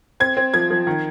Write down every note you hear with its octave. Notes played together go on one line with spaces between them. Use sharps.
C4 G#6
C4
F3 G#6
F3
D#3